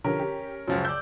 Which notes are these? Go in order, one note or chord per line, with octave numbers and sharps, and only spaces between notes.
D3 F3 C#4 G4 A#4
G4
C#2 F#2 F3 F#3
D5 E6 G6